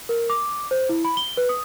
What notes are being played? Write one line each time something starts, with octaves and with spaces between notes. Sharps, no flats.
A#4
D6
C5
E4
B5
G7
B4
D#6